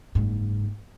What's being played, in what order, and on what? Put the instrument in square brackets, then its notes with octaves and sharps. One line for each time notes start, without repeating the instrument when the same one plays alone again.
[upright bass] F#1 G#2